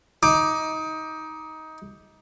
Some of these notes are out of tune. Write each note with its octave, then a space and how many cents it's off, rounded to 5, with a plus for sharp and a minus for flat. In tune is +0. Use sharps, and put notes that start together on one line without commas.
D#4 +20 D6 +20